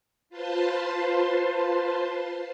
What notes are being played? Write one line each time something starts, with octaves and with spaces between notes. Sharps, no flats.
F4 B4 C5 A5 C6